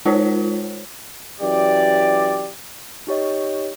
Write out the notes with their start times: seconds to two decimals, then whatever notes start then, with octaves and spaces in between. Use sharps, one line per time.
0.05 G#3 D#4 F4 A#4 C5 C#5
1.40 F#2 E3 G4 D5
3.07 D#4 G4 C#5 D#5